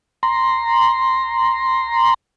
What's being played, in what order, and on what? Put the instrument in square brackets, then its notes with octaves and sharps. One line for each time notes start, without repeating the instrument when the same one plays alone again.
[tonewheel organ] A#5 C6